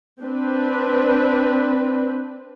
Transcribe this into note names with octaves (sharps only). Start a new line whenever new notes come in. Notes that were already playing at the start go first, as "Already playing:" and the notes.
C4 D4 B4